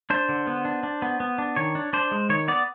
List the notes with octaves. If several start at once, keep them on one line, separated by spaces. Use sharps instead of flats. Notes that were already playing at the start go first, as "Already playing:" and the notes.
D4 C5
D3
B3
D4
D4
B3
B3
D4
D#3 C#5
D4
D4 C5
G#3
D#3 C#5
B3 D5